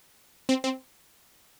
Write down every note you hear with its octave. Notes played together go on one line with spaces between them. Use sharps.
C4
C4